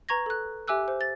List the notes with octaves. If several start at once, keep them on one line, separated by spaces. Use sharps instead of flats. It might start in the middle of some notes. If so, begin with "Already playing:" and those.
B4 A#5 C#6 G#6 A#6
A4 F#6
G4 E5 G#5 D6 E6 F#6
C5
A6